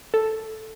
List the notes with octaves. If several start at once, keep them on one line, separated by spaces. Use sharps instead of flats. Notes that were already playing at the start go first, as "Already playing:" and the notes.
A4